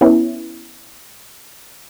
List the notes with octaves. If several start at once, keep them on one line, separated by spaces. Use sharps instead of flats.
B3 C#4 E4